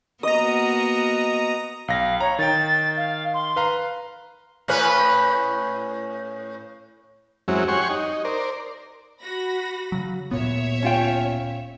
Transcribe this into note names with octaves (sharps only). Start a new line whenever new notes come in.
A#3 B3 F#4 D#5 A#5 D#6
B1 F5 A#6
C#5 A#5
D#3 G5 A6
F5
C6
B4 F5 A#5
A2 C#4 B4
F#2 F#3 G#3 C4 C#4 E4
G4 C#5 F#5 G#5 C6 C#6
D#4
A#4 C5 D5
F#4 B5 A#6
C#3 F#3
D1 A#2 B3 C#5 E5
C#4 F4 G5